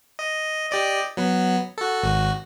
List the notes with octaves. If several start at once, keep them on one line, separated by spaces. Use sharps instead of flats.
D#5
G4 D5 D#5
F#3 B3
F#4 A4
G#1 F#4